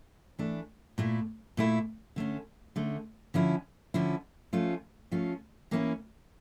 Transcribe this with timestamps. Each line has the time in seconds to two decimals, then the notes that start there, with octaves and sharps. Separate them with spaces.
0.39 E3 A3 D4
0.98 A#2 A3 E4
1.57 A#2 A3 E4
2.16 D3 A3 C#4
2.76 D3 A3 C#4
3.34 D3 F3 C#4 E4
3.94 D3 F3 C#4 E4
4.53 F3 A3 C#4 F4
5.11 F3 A3 C#4 F4
5.71 E3 A#3 C#4 E4